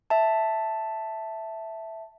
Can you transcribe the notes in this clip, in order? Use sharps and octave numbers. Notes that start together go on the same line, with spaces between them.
E5 A5